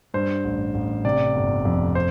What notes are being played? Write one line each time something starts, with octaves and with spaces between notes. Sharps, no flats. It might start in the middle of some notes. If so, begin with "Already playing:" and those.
G2 C5
A1
A1
C3 D5
G1
F2
C5